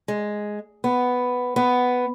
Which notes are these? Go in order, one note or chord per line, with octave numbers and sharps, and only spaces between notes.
G#3
B3
B3